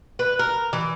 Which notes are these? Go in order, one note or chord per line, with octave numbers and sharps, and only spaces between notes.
B4
A#4
E3